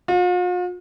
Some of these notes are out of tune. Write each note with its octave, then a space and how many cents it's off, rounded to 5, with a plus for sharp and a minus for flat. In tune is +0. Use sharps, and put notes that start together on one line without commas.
F4 +45